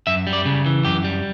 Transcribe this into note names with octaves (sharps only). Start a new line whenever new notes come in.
F#2 E5
G3
D5
C#3
E3
F#2 G4
G3